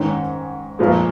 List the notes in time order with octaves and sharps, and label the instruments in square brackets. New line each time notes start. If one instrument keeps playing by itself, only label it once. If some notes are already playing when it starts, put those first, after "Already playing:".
Already playing: [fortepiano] G#2 D#3 C#4
A#1 A#2 F3 G#3